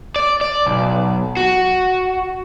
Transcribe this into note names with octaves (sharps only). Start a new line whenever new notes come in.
D5
D5
B1
F#4